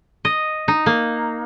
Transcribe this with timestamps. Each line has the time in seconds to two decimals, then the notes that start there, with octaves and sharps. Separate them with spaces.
0.25 D#5
0.68 D#4
0.86 A#3